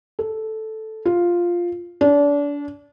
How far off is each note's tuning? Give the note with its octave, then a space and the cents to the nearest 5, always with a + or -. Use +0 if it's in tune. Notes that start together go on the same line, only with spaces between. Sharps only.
A4 -5
F4 +0
D4 -30